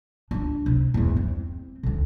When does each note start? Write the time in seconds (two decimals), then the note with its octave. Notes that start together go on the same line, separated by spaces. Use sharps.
0.31 C#2 D4
0.66 C3
0.94 E2 G#2
1.16 C4
1.83 D2 D3